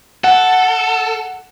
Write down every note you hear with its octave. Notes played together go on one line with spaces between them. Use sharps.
A4 F#5